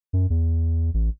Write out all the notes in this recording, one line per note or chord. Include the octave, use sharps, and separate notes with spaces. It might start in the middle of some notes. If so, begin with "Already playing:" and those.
F#2
E2
A1